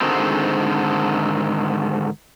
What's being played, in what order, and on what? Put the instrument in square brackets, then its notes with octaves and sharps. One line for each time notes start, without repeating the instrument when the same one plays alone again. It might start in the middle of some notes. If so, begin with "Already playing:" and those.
[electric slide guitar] G#2 D3 D#3 G#3 C4